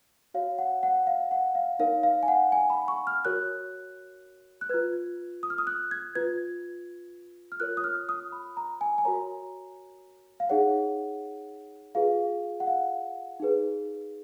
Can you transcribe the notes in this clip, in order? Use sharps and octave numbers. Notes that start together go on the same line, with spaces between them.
F#4 C#5 F5
F#5
F#5
F5
F#5
F5
D#4 A#4 C#5 F5
F5
G#5
F#5
G#5
B5
C#6
F6
F#4 A#4 C#5 F#6
F#6
F4 B4 G#6
D#6
F6
D#6
F#6
G#6
F4 B4 G#6
F6
F4 A#4 C#5 F#6
D#6
F6
D#6
B5
A#5
G#5
G#5
F#4 A#4 C#5 A#5
F5
D#4 G#4 C#5 F#5
F4 G#4 B4 F5
F#5
F5
D#4 G#4 B4